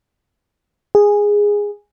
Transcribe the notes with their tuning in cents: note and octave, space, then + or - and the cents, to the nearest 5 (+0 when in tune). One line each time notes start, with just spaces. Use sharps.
G#4 -10